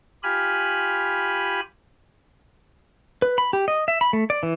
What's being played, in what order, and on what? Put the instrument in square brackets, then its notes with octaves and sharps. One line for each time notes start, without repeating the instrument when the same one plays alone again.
[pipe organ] F4 G4 G#5 B5 F6
[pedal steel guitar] B4
B5
G4
D#5
E5
B5
A3
D5
E3